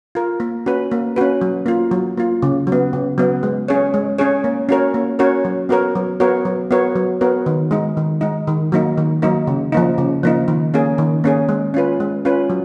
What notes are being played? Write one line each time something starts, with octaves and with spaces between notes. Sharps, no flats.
F4 A#4
A#3
C#4 F#4 B4
A#3
C#4 F#4 B4
F#3
A#3 F4
F#3
A#3 F4
C#3
F#3
B3
C#3
F#3 B3
G#3
C#4 G#4 C#5
G#3
C#4 G#4 C#5
A#3
C#4 F#4 A#4 C#5
A#3
C#4 F#4 A#4 C#5
F#3
B3 F#4 A#4 C#5
F#3
B3 F#4 A#4 C#5
F#3
B3 F#4 A#4 C#5
F#3
B3 F#4 A#4 C#5
D#3
G#3 D#4
D#3
G#3 D#4
D#3
F#3 A#3 D#4
D#3
F#3 A#3 D#4
C#3
F3 A#3 D#4
C#3
F3 A#3 D#4
D#3
A#3 C#4 G#4
D#3
A#3 C#4 G#4
G#3
C#4 F4 B4
G#3
C#4 F4 B4
F#3